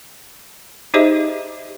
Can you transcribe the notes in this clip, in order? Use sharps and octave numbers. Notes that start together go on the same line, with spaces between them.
D#4 G4 G#4 C5 D#5 E5